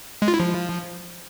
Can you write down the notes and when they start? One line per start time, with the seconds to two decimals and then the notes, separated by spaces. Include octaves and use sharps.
0.22 G#3
0.28 F4
0.34 E4
0.40 F3